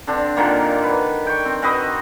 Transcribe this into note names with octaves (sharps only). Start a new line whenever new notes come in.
D3 C4 D4
A#2 D3 D#3 A#3
B4
G5 C#6
C4
C4 F#4 B4 D#5